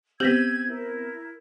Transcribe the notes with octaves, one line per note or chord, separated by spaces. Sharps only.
B3 C4 G4 E6 G6 G#6 A#6 B6
E4 A#4